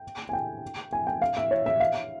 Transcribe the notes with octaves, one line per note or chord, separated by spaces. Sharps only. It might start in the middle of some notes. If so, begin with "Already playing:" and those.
Already playing: G5
G#5
G5
G#5
G5
F5
E5
C#5
E5
F5